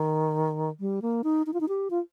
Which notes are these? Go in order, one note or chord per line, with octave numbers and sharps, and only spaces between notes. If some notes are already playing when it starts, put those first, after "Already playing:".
Already playing: D#3
G3
A#3
D#4
D#4
F4
D#4
G4
F4